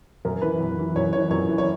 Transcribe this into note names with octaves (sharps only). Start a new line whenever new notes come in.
F#2 A#4
E3 B4
F#2
E3
F#2 C#5
E3 C#5
F#2 C#5
E3
C#5